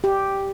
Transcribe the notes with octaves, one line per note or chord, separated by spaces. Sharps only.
G4